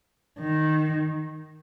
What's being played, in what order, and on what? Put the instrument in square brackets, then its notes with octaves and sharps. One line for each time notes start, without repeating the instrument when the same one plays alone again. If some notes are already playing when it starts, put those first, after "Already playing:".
[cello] D#3